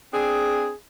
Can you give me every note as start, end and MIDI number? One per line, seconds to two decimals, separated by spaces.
0.14 0.72 60
0.14 0.72 62
0.14 0.72 68